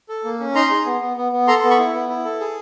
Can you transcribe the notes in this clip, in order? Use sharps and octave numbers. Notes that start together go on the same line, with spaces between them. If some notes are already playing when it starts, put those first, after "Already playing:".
A4
A#3
C#4
D#4 A#5 C6
G#4
B3
B3
B3
B3
A4 A#5 C6
B3
B5 C#6
E4
B3
E4
A4
G#4